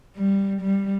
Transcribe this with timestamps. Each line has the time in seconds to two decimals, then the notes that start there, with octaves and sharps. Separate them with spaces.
0.16 G3
0.62 G3